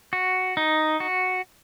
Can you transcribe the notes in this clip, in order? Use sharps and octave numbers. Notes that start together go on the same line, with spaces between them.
F#4
D#4
F#4